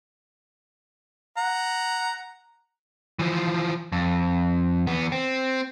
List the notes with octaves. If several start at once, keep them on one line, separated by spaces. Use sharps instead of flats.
F#5 A#5
E3 F3
F2
E2 B3
C4